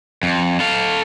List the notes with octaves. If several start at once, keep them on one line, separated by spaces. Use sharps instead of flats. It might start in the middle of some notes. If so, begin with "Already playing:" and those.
F2
A4 F5